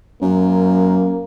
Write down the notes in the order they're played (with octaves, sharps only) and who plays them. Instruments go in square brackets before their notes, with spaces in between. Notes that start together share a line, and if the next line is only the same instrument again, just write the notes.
[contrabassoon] F#2 [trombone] A#3